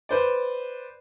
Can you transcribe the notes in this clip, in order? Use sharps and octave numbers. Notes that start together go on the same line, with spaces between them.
B4 C5 D5